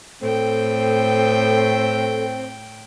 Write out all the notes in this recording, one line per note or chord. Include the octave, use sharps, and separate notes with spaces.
A2 C4 A4 G5